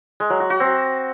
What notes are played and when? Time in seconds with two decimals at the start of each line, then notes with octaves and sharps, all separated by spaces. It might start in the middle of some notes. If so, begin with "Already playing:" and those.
0.20 G#3
0.30 F#3
0.40 F#4
0.50 F#4
0.60 C4